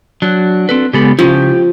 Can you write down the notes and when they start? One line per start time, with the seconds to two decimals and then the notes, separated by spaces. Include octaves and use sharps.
0.22 F#3 D4 F#4
0.69 C4 A4 B4
0.93 C#3 G#3 B3 G4 A4 B5
1.19 C#3 F3 C#4 E4 G4